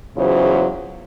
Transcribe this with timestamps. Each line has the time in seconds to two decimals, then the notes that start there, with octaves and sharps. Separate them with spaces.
0.17 E2 C#3 F#3 F4 C5